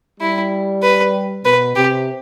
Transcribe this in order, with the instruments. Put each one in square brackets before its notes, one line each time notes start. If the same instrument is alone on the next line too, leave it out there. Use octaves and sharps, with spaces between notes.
[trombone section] G3 [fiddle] E4
[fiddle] B4
[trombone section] B2 [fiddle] B4
[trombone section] C3 [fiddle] G4